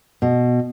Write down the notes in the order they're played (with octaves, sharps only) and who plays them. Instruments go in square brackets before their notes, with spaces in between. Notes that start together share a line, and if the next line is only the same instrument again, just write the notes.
[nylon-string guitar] B2